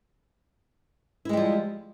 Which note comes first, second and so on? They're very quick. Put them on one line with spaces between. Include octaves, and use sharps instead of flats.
E4 G#3 G3 F3